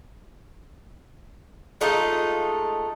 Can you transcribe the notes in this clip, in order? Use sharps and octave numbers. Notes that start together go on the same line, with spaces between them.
G#3 A3 D#4 F4